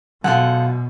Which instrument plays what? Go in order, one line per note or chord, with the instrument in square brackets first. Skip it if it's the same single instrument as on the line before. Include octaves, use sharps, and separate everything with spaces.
[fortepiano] F#2 [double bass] B2 [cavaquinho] F4 A4 F#5